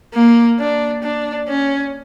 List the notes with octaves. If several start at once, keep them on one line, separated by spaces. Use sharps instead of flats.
A#3
D4
D4
C#4